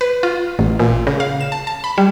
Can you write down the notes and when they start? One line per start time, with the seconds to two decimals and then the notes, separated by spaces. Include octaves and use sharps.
0.01 B4
0.23 F4
0.59 A1
0.79 A#2
1.07 C#3
1.20 F5
1.41 E7
1.52 A5
1.67 A5
1.84 B5
1.98 G3